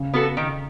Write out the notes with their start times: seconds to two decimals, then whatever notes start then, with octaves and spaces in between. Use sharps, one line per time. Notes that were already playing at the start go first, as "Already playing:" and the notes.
Already playing: C#3
0.14 B3 F#4 A4
0.37 D#3